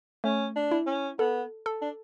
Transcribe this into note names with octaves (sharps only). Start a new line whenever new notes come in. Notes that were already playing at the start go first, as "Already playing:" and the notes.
A3 C#4
D4
E4
C#4
B3 A4
A4
D4